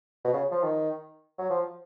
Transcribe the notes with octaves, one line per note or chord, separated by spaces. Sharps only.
B2
C#3
F3
D#3
F#3
F3